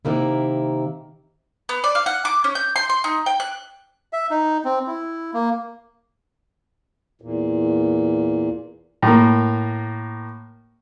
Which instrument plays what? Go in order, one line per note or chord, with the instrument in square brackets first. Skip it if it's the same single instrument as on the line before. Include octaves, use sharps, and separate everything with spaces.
[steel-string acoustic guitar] C3 D#3 A#3 E4
[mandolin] B3
D5
F5
F#5
D6
C#4
G6
C6
C6
D#4
G5
F#6
[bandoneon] E5
D#4
C4
E4
A#3
[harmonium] E2 A#2
[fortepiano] A2 A#3